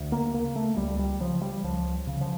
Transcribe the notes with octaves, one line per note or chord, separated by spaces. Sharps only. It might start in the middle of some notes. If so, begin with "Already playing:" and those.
Already playing: D2
A#3
C#3 A#3
A3
C#2 G3
G3
C#3 F3
G3
C#2 F3
C#3
F3